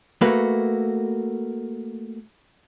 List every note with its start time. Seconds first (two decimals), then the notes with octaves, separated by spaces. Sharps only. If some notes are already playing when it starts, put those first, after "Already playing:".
0.21 A3 A#3 F#4 B4